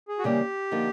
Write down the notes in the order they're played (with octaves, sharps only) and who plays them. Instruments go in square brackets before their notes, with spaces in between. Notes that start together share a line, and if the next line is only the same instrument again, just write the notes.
[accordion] G#4
F#4
[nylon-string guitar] C#3 E3 G3 A#3 [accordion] G4
[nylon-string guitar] D3 F3 A#3 D#4